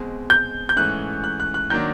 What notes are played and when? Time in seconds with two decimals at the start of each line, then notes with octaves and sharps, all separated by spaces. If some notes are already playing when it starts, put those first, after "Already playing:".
Already playing: B2 G#3 C4
0.30 G6
0.69 G6
0.76 G#2 E3 A3 C#4 F#6
1.24 F#6
1.40 F#6
1.54 F#6
1.70 D#3 F#3 A#3 D4 G6